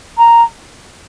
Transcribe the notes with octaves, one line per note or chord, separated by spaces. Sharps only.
A#5